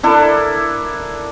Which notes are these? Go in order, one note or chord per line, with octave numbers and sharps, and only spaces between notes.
D4 E4 A4 A#4